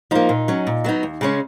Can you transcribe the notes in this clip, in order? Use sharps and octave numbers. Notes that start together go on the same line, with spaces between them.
F3 A#3 D#4
A#2
F#3 C#4
A#2
F#3 B3 D#4
D#2
C#3 G#3 C#4